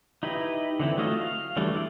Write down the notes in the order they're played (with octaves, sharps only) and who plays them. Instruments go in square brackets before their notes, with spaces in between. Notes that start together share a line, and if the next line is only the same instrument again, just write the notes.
[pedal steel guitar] D#4 E4 G4 B4 D#5
D3 E3 C4 E4
F#3 A3 F4 D#5
F5
E3 F#3 G3 A3 D4
A3 E4 D5